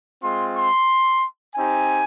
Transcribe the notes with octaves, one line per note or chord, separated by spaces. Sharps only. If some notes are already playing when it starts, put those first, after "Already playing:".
G#3 C4 F4 C6
C6
C4 D#4 G4 G#5